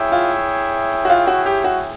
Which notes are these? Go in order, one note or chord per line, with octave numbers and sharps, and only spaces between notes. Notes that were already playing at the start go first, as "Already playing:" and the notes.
Already playing: E4 G#4 C#5 E5 G5
F4
F#4
F4
F#4
G4
F#4